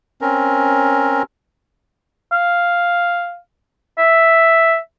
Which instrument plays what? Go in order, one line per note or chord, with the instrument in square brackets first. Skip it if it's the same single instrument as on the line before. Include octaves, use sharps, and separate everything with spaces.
[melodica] C4 C#4 A#4
[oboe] F5
E5